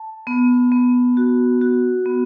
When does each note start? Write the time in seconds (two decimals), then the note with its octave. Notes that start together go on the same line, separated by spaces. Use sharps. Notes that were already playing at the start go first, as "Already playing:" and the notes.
Already playing: A5
0.27 B3
0.72 B3
1.17 F#4
1.61 F#4
2.06 B3